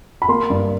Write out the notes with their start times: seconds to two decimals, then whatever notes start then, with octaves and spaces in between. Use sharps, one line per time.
0.22 B5
0.28 A#3 C6
0.50 G2